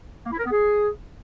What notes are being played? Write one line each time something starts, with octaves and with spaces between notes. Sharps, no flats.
A#3
E4
A#4
B3
G#4